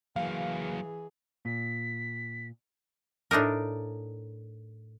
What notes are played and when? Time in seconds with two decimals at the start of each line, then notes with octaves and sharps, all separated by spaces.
0.16 E3 F#3 A#3 G#4 F5
1.45 A#2 B6
3.31 A2 D4 D#4 A#4